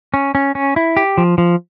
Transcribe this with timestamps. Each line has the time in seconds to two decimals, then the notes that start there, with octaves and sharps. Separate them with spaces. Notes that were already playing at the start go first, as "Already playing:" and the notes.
0.14 C#4
0.35 C#4
0.55 C#4
0.76 E4
0.97 G4
1.18 F3
1.38 F3